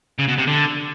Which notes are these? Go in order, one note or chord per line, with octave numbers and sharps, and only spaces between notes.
C#3
B2
C3
D3